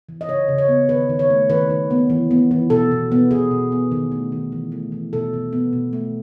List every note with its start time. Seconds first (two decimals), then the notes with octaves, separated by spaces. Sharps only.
0.09 E3
0.21 D#5
0.28 C#3 C#5
0.48 C#3
0.58 C#5
0.68 B3
0.89 D#3 B4
1.09 D#3
1.19 C#5
1.30 A3
1.49 D#3 B4
1.70 D#3
1.91 B3
2.10 E3
2.31 B3
2.51 E3
2.70 B2 A4
2.91 B2
3.12 B3
3.31 B2 G#4
3.51 B2
3.72 B3
3.92 D#3
4.12 A3
4.32 D#3
4.52 E3
4.72 A3
4.92 E3
5.13 B2 A4
5.33 B2
5.53 B3
5.73 B2
5.93 A3